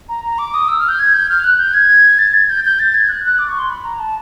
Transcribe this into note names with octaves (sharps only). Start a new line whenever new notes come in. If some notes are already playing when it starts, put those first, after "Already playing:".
A#5
A#5
D6
D#6
E6
F6
G6
G#6
G6
F6
F#6
G6
G#6
A6
G#6
G6
G6
A6
G#6
F#6
F#6
D6
C#6
C6
B5
A#5
A5